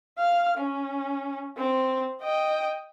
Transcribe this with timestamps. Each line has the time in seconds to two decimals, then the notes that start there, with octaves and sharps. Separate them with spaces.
0.19 F5 F6
0.57 C#4
1.58 C4
2.22 D#5 G5